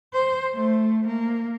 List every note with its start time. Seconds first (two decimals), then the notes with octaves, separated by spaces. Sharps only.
0.13 C5
0.54 A3
1.07 A#3